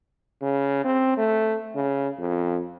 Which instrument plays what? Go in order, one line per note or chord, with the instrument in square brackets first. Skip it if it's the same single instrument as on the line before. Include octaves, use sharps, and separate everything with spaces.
[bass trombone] C#3
C4
A3
C#3
F2